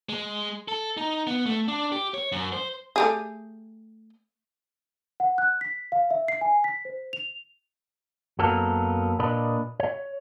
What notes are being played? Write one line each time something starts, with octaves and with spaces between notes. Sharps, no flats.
G#3
A4
D#4
B3
A3
D4
G4
C#5
F#2
C5
A3 G4 G#4
F#5
F#6
B6
F5
E5
C7
G#5
B6
C5
F7
F#2 F#3 A#3 B3 A4 A#4
A#2 D4 A#4 B4 D#5 B5
C#5